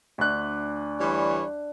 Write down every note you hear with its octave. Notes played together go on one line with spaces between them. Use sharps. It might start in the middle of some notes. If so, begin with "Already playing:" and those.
D2 D4 E5 F#6
E3 G3 C#5